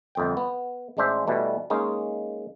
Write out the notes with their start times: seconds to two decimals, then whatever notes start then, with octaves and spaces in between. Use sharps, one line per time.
0.15 G1 F2 G5
0.37 B3
0.97 A1 G#3 D4 C5 E5
1.27 B2 E3 G3 A3
1.70 G#3 A#3 C#4 D#4